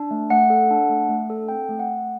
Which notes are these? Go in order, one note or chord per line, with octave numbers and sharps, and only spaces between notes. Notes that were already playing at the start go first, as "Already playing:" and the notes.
Already playing: D4
A3
A3 F#5
A4
D4
A3
A3
A4
C4 G5
A3
F#5
A3